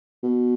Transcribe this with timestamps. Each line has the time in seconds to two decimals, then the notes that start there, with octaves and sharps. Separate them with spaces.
0.23 B2